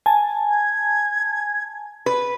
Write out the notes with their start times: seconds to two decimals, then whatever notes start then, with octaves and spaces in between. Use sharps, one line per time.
0.06 G#5 A5
0.51 G#6
2.06 B4